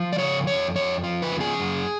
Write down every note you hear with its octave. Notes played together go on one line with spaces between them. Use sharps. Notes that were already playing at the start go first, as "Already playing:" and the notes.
Already playing: F3
D5
C#3 C#5
F2 C#5
F2 C#5
F3
B4
C#3
G#4
F#2